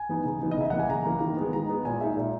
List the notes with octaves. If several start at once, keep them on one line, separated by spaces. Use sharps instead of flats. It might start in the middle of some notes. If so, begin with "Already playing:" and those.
Already playing: G#5
E3 B3 D#4
C#3
E3 B3 D#4
D#5
C#3 E5
E3 A#3 F#5
G#5
C#3 A#5
E3 A#3
D#3
G#3 B3
D#3 A#5
G#3 B3
A#2 G#5
G#3 D#4 E5
A#2